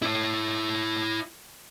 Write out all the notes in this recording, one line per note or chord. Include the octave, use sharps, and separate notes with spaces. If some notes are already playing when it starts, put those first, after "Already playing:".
E4 C#5